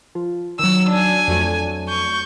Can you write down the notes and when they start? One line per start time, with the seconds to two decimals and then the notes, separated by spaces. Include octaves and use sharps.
0.15 F3
0.59 D#3 F#3 E6
0.90 D4 G#5
1.28 F2 F#3 A3
1.89 C#6 G6